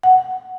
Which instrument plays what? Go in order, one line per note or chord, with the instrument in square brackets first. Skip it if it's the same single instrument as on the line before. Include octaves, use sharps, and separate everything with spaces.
[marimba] F#5